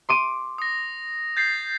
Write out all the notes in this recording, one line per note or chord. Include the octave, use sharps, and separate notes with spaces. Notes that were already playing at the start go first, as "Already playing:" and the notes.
C6 D6 D#7
D#6 A#6
G6 A6 C7